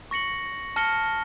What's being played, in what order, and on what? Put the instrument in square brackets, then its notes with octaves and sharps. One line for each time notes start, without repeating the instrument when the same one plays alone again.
[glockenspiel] C#6 A#6 C#7 F#7
A5 F6 A#6 C#7 G7